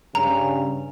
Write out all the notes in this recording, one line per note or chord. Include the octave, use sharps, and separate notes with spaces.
G2 C#3 A#5